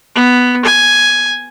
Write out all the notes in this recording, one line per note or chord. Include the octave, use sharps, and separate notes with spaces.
B3
G#5